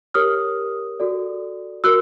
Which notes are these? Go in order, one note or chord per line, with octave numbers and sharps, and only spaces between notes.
G4 A#4 C#5 D#6 F6
F#4 A4 D5
F#4 A#4 E6 F#6